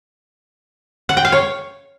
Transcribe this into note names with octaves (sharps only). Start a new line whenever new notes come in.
F#5
G5
F5
C#5